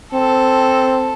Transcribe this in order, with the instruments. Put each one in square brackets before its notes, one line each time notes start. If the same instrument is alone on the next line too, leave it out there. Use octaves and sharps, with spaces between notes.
[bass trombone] C4 [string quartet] A4